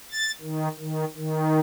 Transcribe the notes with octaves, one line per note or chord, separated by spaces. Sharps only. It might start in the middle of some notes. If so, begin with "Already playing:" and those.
A6
D#3
D#3
D#3